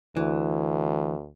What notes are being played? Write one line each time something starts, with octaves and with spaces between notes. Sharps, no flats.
D2 E3